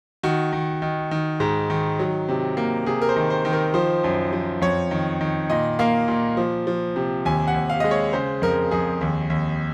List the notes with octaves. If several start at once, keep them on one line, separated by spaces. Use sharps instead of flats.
D#3 F#4
D#3
D#3
D#3
G#2
D#3
F#3
C3
A#3
C3 G#4
A#4
C5
D#3
C5
D#3
A#4
F3 C5
F#2
F3
F2 C#5
D#3
D#3
A#2 D#5
A#3 F5
A#2
F3
F3
C3
D#2 G#5
F#5
D#2
F5
G#3 D#5
C#5
C#3 C5
F2 A#4
F2 G#4
D#2
D#2